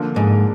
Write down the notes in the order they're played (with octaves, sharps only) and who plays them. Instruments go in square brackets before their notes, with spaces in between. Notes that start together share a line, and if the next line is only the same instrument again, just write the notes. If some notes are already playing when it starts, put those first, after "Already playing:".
Already playing: [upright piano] D3 F3 A#3
[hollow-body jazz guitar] G#2